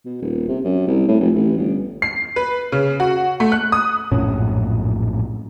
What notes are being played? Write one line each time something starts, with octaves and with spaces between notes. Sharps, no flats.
B2
D#1
C3
F#2
C2
A2
F1
A1
G1
C7
B4
C#3
F#4
A3
F#6
D#6
A#1 F#2 A2 C#4